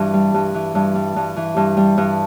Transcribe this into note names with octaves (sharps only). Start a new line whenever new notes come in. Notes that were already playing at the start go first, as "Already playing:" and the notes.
Already playing: G2 E3
G3
G2
E3
G2
G3
G2
E3
G2
G3
G2